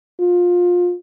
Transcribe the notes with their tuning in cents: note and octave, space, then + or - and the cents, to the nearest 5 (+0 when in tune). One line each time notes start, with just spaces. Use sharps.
F4 +20